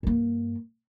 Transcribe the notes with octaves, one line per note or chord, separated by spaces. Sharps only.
G2 A#3